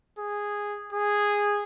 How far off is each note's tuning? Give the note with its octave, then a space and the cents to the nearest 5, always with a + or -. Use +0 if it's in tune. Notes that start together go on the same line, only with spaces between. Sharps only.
G#4 -10
G#4 -10